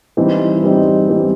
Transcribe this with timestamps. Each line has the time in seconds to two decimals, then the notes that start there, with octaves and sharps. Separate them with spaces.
0.17 E3 G3 C4 D#4
0.63 E3 G3 C4 D#4
1.08 E3 G3 C4 D#4